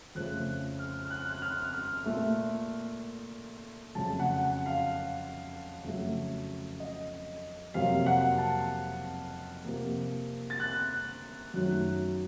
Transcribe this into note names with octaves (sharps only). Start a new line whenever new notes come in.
F2 C#3 F3 A3 F#6
F6
F6
F#6
F#6
F6
F6
A#2 A3
F2 C#3 F#3 A3 A5
F#5
F#5
F5
F2 C#3 F#3 A3
D#5
F2 C3 F#3 A#3 F5
F#5
A5
C3 F3 A#3
A6
F#6
F#2 D#3 F#3 A3 F#6